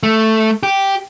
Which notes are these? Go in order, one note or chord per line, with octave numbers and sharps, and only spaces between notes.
A3
G4